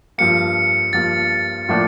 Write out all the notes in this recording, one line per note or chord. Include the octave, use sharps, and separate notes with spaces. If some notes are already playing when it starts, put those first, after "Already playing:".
G2 F3 A#3 C#7
G2 F3 A#3 A6
A2 F3 A#3 D4 A4